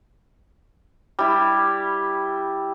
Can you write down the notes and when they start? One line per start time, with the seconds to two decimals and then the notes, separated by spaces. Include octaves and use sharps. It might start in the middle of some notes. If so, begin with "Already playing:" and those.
1.19 G3 E4